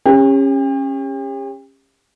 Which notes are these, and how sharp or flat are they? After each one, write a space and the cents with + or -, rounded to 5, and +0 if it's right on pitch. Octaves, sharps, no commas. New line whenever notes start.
C#4 -20 G4 +40